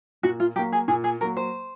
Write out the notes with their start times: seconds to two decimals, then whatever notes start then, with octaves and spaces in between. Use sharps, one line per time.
0.23 A#2 F#4
0.40 F4
0.56 F#3 G4
0.59 A#3
0.72 G#4
0.88 A#2 G#4
1.04 G#4
1.21 F#3 A#3 A#4
1.37 C5